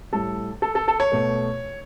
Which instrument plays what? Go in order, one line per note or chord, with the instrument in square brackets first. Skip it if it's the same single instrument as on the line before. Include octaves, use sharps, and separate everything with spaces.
[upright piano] A2 G3 A4
A4
A4
A4
C#5
B2 A3